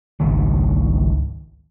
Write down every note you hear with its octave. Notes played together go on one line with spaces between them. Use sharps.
G#1 C#2 D#3 G3